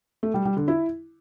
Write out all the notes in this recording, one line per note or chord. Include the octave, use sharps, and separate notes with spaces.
A3
G3
G3
D3
E4